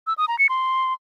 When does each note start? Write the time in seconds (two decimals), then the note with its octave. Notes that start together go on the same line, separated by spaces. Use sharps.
0.07 E6
0.18 D#6
0.28 A#5
0.39 C#7
0.49 C6